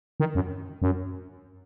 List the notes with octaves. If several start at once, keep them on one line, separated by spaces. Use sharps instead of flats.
D#3
F#2
F#2